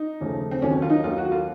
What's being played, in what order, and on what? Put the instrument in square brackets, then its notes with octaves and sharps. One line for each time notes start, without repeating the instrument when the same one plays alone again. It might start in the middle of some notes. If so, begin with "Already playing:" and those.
Already playing: [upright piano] D#4
D#2 C#3 F3 A3
C4
D#2 D#3 F#3 A#3 C#4
F4
D#4
D#2 D#3 F#3 A#3 F4
F#4
F4